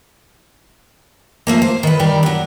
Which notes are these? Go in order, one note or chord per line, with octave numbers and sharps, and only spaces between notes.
F3 A3 A#3
C5
D#3 B4
D#3 G3 D5
F#3 D4